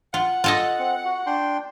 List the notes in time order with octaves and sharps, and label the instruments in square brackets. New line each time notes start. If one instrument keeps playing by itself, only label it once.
[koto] F4 [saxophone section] F#5
[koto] F4 A4 D#5
[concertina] C4
F#4
D4 G5 C6